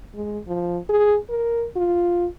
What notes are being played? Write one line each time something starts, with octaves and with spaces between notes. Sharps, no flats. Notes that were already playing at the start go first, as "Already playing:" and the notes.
G#3
F3
G#4
A#4
F4